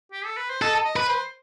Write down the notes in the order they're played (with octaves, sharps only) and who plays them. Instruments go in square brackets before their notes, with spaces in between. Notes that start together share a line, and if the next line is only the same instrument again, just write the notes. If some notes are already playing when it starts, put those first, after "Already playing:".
[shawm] G4
A4
B4
C5
[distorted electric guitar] A4 [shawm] D#5
[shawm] D#5
[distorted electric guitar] B4
[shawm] C5